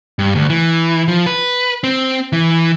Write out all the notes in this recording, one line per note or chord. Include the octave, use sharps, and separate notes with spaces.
G2
D2
E3
F3
B4
C4
E3